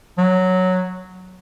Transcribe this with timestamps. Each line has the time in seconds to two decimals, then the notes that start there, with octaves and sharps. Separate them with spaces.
0.18 F#3